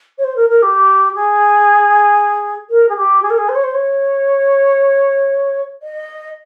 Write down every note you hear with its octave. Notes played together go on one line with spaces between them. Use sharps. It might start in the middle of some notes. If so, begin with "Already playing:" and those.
C#5
C5
A#4
A#4
G4
G#4
A#4
G#4
G4
G#4
A#4
G#4
C5
C#5
C5
C#5
D#5